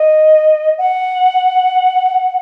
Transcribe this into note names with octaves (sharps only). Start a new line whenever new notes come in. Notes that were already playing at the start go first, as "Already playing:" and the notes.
Already playing: D#5
F#5